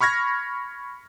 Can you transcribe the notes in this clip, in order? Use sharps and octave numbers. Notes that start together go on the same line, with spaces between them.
B5 C#6 F6 G#6 A#6